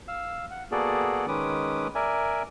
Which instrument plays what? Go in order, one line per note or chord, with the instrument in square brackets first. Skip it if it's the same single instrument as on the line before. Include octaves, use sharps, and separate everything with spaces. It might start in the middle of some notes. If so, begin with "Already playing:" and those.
[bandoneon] F5 E6
F#5
A#3 B3 F#4 G#4 A4 D5
D#3 G#3 C#4 B4 D6 D#6
A#4 D5 E5 G#5